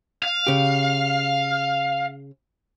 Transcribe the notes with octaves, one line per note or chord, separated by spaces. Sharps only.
F5
C#3 G4